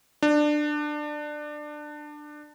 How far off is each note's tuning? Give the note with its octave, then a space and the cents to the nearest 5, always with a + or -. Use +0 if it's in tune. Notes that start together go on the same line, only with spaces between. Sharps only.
D4 +20